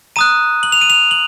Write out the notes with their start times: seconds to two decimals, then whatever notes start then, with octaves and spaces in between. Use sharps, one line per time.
0.16 A#5 D#6 F#6 D#7
0.63 F#7
0.72 F7
0.81 D#7
0.90 F7
1.11 F#7